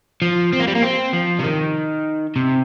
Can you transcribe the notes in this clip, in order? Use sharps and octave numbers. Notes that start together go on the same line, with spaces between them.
F3
C4
A#3
G3
A#3
C4
F3
C3
D#3
C3